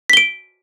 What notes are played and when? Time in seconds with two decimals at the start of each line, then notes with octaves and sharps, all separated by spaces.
0.10 B6
0.13 G7
0.17 D7